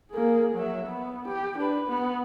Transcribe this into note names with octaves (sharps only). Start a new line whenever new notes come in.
A#3 G#4
F#3 E5
B3
G4
D4 B4
B3